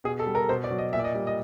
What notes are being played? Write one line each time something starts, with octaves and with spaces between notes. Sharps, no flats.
B2 G#4
A4
G3
A#4
B2 C5
D5
F#3
D#5
A#2 E5
D5
D#5
G3
D#5